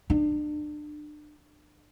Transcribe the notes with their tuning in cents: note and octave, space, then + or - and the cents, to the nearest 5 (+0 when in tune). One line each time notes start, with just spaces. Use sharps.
D4 +30